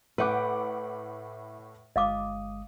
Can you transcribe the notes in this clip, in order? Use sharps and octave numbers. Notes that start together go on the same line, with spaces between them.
A2 B4 E5 F#5 G5 B5 D6
G1 G#3 D#5 F5 D6 D#6